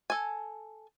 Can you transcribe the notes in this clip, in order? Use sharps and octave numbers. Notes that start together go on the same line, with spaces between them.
A4 G#5